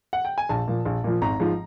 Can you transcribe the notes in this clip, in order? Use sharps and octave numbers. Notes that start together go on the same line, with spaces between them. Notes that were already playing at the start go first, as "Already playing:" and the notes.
F#5
G5
G#5
A#1 A5
A#2 F3
A#1
A#2 F3
G#1 A#5
G#2 F3